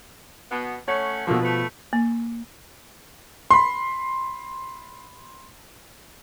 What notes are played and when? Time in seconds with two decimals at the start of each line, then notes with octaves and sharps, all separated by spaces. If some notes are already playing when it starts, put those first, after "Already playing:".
0.51 B2 B3
0.88 A3 C#4 C#5 F#5
1.27 B2 D3 F3 A3 A#3
1.42 A3 B4
1.93 A#3
3.51 B5 C6